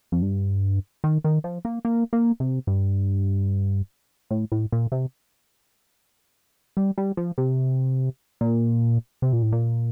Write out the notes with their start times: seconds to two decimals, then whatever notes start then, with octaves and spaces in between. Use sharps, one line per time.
0.12 F2
0.22 G2
1.04 D#3
1.24 D#3
1.44 F3
1.65 A#3
1.85 A#3
2.13 A#3
2.40 C3
2.67 G2
4.31 A2
4.52 A2
4.72 A#2
4.92 C3
6.77 G3
6.98 G3
7.17 F3
7.38 C3
8.41 A#2
9.22 C3
9.33 A#2
9.42 A2
9.52 A#2